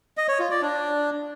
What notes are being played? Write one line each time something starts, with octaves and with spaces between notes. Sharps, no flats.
D#5
C#5
F4
D5
D4